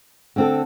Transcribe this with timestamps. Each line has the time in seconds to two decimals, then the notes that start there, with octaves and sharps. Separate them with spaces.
0.36 D3 C4 A4